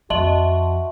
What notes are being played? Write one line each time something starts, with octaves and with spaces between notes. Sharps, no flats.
F2 F#4 D#5 E5 A5 C6 F#7